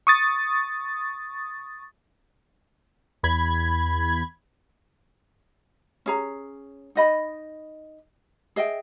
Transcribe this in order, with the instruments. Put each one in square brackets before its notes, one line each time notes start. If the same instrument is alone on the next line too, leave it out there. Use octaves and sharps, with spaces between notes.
[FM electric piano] C#6 D#6 A6
[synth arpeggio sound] E2 B5 G#6
[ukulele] C#4 G#4 A#5
D#4 D#5 B5
G#4 D#5 E5 G5